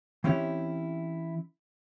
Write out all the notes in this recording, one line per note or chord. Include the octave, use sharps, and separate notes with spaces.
E3 C4 C#4 E4 G4 C#5